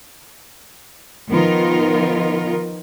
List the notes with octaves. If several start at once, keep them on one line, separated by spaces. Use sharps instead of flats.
D#3 F3 B3 D#4 F4 A#4